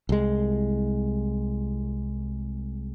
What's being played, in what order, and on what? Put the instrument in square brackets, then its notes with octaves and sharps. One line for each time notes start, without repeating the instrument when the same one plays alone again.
[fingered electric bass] C2 G#3